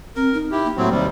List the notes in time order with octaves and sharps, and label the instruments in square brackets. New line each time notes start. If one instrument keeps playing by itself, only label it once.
[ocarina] C4 [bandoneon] A#4
[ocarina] D#4
[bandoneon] E4 G4
[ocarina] A#3
[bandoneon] A2 F#3 C4
[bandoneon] D#2 C3 G3 [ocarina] C5